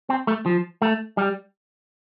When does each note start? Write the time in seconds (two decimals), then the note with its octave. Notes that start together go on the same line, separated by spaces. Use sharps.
0.09 C4
0.27 A3
0.46 F3
0.82 A3
1.17 G3